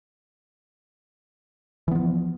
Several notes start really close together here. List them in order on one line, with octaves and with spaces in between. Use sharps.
E3 B3 F3